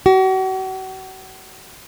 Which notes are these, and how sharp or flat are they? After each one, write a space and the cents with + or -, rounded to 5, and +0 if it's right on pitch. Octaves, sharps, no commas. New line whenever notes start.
F#4 +40